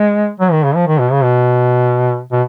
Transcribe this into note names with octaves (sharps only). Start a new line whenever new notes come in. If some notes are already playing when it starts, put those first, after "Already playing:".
Already playing: G#3
F#3
D#3
C#3
F3
D#3
B2
C#3
B2
B2